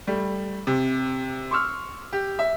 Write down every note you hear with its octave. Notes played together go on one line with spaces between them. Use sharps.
G3 A3
C3
C6 C#6 E6 F6
G4
E5